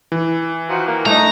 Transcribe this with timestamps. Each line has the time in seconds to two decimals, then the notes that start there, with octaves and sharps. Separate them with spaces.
0.12 E3
0.69 D#3 F3 F#4
0.87 A#3
1.06 A3 D4 D#4 A#5